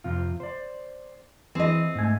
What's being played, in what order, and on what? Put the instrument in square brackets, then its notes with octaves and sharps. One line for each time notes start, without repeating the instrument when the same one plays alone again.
[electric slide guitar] F2 C3 F4
C5 D5
[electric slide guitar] E3 G#4 [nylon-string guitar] C4 D#5
[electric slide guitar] G#2 A3 G#5